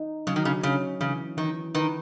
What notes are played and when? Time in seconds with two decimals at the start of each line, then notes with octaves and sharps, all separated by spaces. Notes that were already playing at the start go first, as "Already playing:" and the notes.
Already playing: D#4
0.27 C#3 F#3
0.36 D#3
0.45 C#3
0.63 C#3 C#4
1.01 C#3 E3
1.37 D#3 E3
1.75 D#3 B4